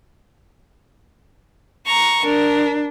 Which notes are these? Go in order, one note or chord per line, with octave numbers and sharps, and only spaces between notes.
A#5 C#6
D4 A#4